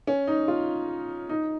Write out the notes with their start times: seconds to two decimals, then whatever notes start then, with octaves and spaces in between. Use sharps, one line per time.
0.07 C#4
0.27 D#4
0.48 F4
1.29 D#4